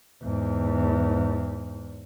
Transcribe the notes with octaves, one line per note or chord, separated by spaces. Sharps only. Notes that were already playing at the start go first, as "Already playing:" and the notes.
E2 G#2